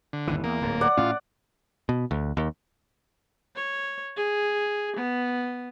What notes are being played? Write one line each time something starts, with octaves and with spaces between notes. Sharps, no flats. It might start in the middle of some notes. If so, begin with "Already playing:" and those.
D3
G1 D#2 E3
E2 A#3
D1 G#2
D5 F#5
A2 C#4 F4
B2
D2
D#2
C#5
G#4
B3